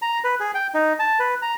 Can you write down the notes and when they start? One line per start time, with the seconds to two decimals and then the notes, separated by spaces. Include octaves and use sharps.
0.02 A#5
0.24 B4
0.40 G#4
0.54 G5
0.74 D#4
0.99 A5
1.19 B4
1.42 A#5